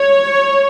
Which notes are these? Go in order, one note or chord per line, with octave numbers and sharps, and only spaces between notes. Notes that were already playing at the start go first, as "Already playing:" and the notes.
Already playing: C#5